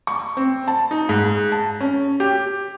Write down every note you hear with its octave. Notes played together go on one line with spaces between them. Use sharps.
C#6
C4
A5
D#4
G#2
A5
C#4
G4